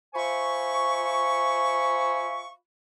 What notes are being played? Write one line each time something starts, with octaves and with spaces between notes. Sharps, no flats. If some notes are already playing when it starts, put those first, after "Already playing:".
F4 C5 E5 G#5 B5 C#6